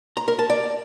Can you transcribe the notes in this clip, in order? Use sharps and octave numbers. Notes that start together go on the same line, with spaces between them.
A#5
A#4
A5
D5